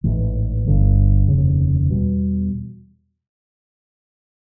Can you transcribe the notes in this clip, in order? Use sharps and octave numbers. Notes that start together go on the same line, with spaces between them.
A1 G#2 E3
G1 G2 D3
F1 D#2 C#3
E2 B2 G3